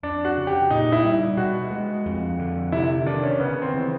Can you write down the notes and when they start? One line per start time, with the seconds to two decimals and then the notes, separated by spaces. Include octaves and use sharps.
0.03 F2 D4
0.25 F#4
0.37 C#3
0.47 G4
0.70 A#2 D#4
0.92 E4
1.04 G3
1.37 B2 F#4
1.71 G#3
2.05 F2
2.39 D3
2.72 C3 E4
3.06 D#3 D4
3.23 C#4
3.40 C#3 B3
3.62 C4
3.74 E3